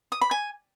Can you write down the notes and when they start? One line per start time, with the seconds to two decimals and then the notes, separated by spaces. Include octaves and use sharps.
0.12 D#6
0.21 B5
0.31 G#5